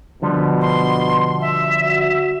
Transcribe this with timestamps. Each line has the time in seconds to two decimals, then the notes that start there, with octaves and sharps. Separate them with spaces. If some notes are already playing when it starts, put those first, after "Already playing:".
0.22 B2 D3 F3 G3
0.61 C6
1.41 E5
1.84 F#4